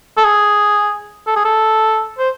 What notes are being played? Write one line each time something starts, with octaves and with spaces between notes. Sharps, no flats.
A4
G#4
A4
G#4
A4
C5